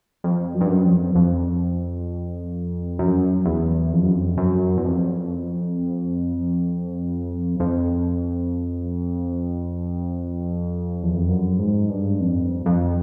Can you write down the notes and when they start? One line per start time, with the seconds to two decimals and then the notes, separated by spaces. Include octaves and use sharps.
0.24 F2
0.54 F#2
0.61 G2
0.69 F#2
0.85 F2
1.15 F2
2.99 F#2
3.46 E2
3.92 F2
4.02 F#2
4.12 F2
4.37 F#2
4.77 E2
4.84 F2
7.60 F2
11.03 E2
11.15 F2
11.28 F#2
11.59 G#2
11.89 G2
12.20 F2
12.66 F2